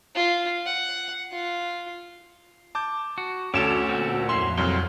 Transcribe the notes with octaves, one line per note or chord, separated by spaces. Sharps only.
F4
F#5
F4
A5 D6 G6
F#4
D2 C#4 A4 C#5 D5 E7
A#2 C4 F#4
F2 F3 F#3 E4 C6 C7
C2 F#3 C6 F6